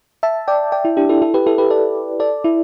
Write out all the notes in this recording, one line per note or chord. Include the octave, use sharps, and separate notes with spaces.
E5 A5
D5 G5
D5 G5
E4
D4 G4
E4 A4
E4 A4
G4 B4
E4 A4
G4 B4
A4 D5
A4 D5
E4